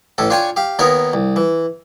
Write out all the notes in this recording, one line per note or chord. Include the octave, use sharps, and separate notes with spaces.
A1 A2 C#4 A4
D4 F4 C#5 G5 G#5 C#6
G4 F5
D#2 B3 D#4 A#4 C#5
C2
E3